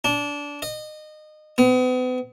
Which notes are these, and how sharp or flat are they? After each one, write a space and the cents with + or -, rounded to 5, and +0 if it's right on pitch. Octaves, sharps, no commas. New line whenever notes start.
D4 -20
D#5 -25
B3 +40